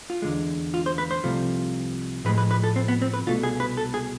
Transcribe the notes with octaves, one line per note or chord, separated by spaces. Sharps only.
F4
E2 D3 G#3
F4
C5
B4
C5
C2 C3 F3 A3
A2 F3 G#3 B4
B4
B4
A4
C4
B3
C4
B4
C2 B2 A3 F4
G#4
B4
A4
G#4